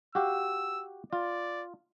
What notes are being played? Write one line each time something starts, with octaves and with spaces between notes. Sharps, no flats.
F#4 G4 F5 E6
F4 D5